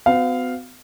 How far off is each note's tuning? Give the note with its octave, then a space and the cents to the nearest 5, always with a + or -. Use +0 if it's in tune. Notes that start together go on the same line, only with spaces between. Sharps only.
B3 +45 F#4 +0 F5 +0